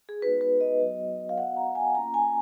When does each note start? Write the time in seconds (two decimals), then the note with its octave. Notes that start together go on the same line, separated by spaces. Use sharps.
0.09 G#4
0.22 G#3 B3 D#4 F#4 B4
0.41 B4
0.61 D#5
0.80 F#3 B3 F#4
1.29 F5
1.37 B3 F#4 F#5
1.57 A#5
1.75 G#5
1.95 A#3 C#4 F4 A#5
2.14 G#5